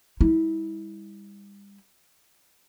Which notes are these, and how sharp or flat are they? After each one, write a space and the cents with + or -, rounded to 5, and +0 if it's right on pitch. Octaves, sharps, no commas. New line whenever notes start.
G3 +40 E4 -25